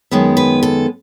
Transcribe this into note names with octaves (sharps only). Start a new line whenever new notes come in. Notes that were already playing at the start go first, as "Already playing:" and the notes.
F#2 D#3 G#3 B3
B4
A4